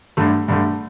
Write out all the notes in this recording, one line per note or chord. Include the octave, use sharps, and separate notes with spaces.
G2 D3 A3
G2 D3 A3